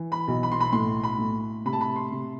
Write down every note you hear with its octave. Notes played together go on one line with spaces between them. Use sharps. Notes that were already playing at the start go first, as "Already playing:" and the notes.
Already playing: E3
B5
B1
B5
C6
B5
A2 C6
B5
A2
C3 B5
A5
B5
C6
C3